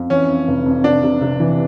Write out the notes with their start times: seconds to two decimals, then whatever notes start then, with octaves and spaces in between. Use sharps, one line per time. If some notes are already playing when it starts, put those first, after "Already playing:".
Already playing: F2
0.10 E3 C#4
0.29 F2
0.48 F1
0.66 F2
0.84 C3 D4
1.03 C3
1.21 C3
1.40 E3